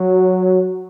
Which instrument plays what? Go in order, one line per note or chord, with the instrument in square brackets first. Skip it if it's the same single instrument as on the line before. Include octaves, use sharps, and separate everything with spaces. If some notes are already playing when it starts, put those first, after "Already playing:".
Already playing: [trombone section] F#3